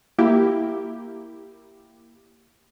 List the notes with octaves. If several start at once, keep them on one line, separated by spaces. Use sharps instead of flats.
A#3 E4 G4